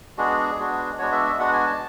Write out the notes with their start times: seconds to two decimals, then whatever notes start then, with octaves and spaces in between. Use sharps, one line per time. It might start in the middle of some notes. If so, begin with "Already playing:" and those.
0.18 G#3 B3 D4 F#4 G#4
0.59 G#3 B3 D4 F#4
0.98 G#3 B3 D4 F#4 C#5
1.12 E5
1.26 E5
1.39 G#3 B3 D4 F#4 F#5
1.53 G#5
1.67 A5